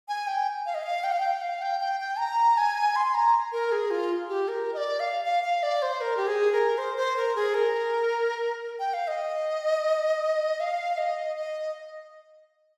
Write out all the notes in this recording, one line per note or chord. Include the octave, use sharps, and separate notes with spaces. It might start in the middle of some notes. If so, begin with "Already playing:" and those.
G#5
G5
F5
D#5
F5
G5
F5
G5
F5
G5
G5
G5
A#5
G#5
C6
A#5
A#4
G#4
F4
G4
A#4
D#5
D5
F5
F5
F5
D5
C5
A#4
G4
G#4
A#4
C5
C5
A#4
G#4
A#4
G5
F5
D#5
F5
D#5
D#5